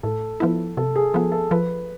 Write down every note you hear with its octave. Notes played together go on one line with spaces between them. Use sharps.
A2 A4
F3 B3 E4
C3 A4
G#4
F3 B3 A4
A4
F3 B4